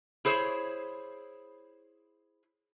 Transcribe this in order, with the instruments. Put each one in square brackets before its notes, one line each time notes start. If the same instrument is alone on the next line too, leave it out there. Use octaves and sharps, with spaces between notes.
[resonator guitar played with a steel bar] E4 G#4 C5 C#5